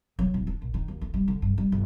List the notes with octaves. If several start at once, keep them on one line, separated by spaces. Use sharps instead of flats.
F#3
D1
D4
A#1
D#3
D#2
D2
G3
D3
G2
G3
G1